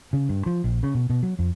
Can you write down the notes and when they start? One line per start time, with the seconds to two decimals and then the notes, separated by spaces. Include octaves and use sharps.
0.13 C#3
0.29 G2
0.46 F3
0.64 A#1
0.83 C#3
0.95 B2
1.10 B2
1.23 F#3
1.39 F2